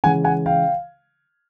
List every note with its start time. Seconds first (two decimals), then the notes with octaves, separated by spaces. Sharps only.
0.04 C#3 E3 G#3 F#5 G#5
0.24 F#5 G#5
0.46 F5 G5